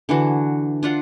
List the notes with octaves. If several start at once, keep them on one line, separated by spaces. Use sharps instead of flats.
D3 E3 F#4
D4 F4 F#5